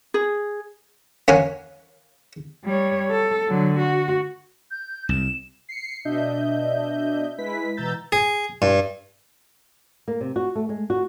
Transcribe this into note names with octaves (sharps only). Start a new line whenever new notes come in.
G#4
A#3 C#4 F#5 G#5
G3 C#5
A4
D3 F#3
F#4
G6
C2 E7
C7 C#7
B2 D4 D#5 E5 G6
G#3 E4 B4 B6
B2 E3 A#5 E6 G6 A6
G#4
G2
A#3
C3
F#4
A3
G#3
F#4